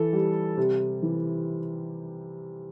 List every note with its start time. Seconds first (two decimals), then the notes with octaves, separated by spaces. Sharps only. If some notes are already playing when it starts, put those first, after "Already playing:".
Already playing: E3 A4
0.13 G3
0.57 C3
1.02 E3